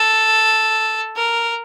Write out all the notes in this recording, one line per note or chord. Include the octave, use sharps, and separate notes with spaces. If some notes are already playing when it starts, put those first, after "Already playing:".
Already playing: A4
A#4